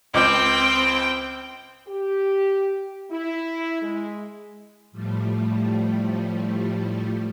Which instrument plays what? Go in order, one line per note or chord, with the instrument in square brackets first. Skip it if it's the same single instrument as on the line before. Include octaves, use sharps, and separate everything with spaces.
[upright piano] C#2 D6 G6 [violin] C4 G5
[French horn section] G4
E4
G#3
[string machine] A2 F3 G3 A3